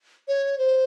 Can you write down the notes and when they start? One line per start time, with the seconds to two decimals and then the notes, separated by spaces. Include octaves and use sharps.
0.28 C#5
0.58 C5